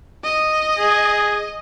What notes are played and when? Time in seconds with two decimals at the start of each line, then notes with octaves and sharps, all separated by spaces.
0.24 D#5
0.78 G#4